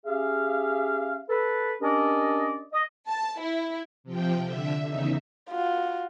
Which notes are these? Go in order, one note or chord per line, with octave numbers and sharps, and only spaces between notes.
C#4 G4 G#4 E5 F5
A4 B4
C#4 D4 G4 A#4 D5 D#5
D#5
A5
E4
C3 F3 G5
D3 E5
E2 C#3 D#4 E5
F4 F#4